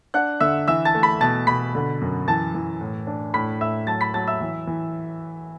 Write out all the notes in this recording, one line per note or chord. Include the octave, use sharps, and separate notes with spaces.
D4 F#5 F#6
D3 E5 E6
E3 E5 E6
A5 A6
A3
B5 B6
B2 A5 A6
B2 B5 B6
D3
F#2
E3 A5 A6
E3
A2
D4
A2 B5 B6
A2 E5 E6
F#3 A5 A6
B5 B6
F#3 A5 A6
E5 E6
E3
E3